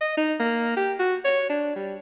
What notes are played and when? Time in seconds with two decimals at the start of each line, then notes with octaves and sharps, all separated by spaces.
0.01 D#5
0.17 D#4
0.40 A#3
0.77 G4
1.00 F#4
1.25 C#5
1.50 D4
1.76 G3